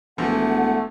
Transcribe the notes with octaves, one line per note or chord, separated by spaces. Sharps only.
E1 E3 F3 A3 F#5